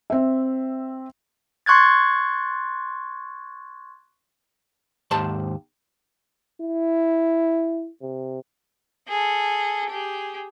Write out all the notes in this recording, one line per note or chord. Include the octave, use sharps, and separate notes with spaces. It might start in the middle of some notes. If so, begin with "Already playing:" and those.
C4 E5
C6 C#6 F#6 G#6 A6
D#2 G#2 C5 A5
E4
C3
G#4 A4
G4 G#4